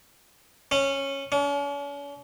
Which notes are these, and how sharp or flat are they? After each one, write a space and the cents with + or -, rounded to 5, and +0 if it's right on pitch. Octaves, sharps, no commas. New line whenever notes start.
C#4 -10
C#4 +45